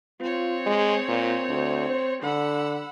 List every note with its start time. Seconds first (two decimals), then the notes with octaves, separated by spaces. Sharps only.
0.21 C4 F4 C#5
0.66 G#3
1.08 A#2
1.49 D2
1.90 C5
2.23 D3 F#5 B5 E6